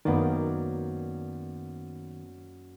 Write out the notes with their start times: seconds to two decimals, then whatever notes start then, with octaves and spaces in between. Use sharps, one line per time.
0.05 F#2 D#3 A#3 B3 D5